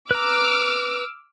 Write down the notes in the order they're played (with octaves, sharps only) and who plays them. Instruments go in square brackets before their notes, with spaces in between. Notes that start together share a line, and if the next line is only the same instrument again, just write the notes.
[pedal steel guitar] B4 A#5 [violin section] D6 E6 F6